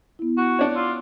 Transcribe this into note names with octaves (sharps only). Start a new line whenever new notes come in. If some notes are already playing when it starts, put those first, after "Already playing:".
B3 E4
F#4
D4 C#5
F4 D6 E6